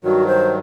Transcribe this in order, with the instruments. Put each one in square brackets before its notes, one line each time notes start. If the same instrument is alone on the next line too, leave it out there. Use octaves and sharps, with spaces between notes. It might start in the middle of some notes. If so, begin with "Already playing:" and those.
[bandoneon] G2 D#3 F#3 [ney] F#4
[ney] C5